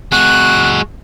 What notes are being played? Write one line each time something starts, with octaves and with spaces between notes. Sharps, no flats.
G#3 F#4 F#6